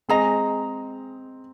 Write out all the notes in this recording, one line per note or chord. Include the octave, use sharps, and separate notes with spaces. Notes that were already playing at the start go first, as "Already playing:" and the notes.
G#3 C4 G#4 D#5 A#5